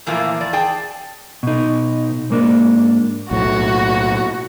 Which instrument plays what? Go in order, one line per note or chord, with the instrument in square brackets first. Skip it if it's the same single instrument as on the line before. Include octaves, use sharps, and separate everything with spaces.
[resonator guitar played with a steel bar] A#2 E3 F3 A3 A#3 F4
E2 D5
G#4 D5 G5 A5
[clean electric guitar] B2 D#4
G#2 A#3 D4
[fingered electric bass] B1 A2 [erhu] F#4